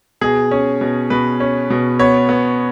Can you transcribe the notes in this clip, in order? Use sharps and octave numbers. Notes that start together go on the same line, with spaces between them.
B2 G#4
C#4
B2
B2 B4
C#4
B2
B3 C#5
B3